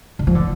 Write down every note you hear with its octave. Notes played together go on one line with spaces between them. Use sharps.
D3
F3
D3